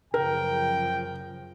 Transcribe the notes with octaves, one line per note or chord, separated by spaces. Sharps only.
F#2 C#3 F3 A#4 G5